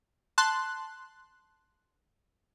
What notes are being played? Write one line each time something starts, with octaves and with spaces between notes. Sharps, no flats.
A5 C6 F#6